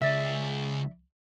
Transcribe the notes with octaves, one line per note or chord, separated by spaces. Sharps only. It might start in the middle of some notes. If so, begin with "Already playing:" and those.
C#2 G#4 D5 E5